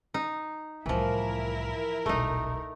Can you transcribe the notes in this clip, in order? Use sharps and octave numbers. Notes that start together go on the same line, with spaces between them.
D#4
C2 A2 E3 F3 E4 A#4
D#1 B1 A3 D#4